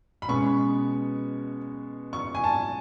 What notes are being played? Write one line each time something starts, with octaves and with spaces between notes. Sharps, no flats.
B5
B2 G#3 C#4 C#6
C#6
G#5
A5